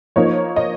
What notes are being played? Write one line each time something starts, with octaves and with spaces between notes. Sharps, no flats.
F3 A#3 D#4 C#5
D#5